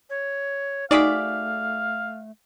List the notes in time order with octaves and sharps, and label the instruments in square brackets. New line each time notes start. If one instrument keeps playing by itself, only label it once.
[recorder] C#5
[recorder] A3 [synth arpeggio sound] D#4 D6 B6 [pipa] F#4 G#4 D5 [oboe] F5